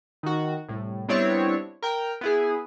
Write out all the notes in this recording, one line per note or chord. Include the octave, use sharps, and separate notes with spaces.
D#3 F#4
C2 A2
G3 B3 C4 D4 E4 C#5
A#4 G5
B3 E4 G#4